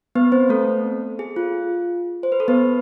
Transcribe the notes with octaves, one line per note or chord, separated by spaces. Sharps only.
B3 B4
C4 C5
A3 A4
G#4
F4
C5
B4
A4
B3 B4